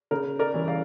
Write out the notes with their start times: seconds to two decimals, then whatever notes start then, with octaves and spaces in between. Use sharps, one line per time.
0.11 C#3 A#4
0.39 A#4 D5
0.54 E3 G3 C#4
0.68 D5 F5